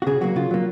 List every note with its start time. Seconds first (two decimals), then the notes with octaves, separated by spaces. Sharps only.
0.02 F#4
0.07 C#3 G#4
0.21 F#3 A#3 F#4
0.36 C#3 F4
0.51 F#3 A#3